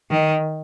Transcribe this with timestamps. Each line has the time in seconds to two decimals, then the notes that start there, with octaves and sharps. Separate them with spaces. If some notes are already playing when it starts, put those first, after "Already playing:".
0.11 D#3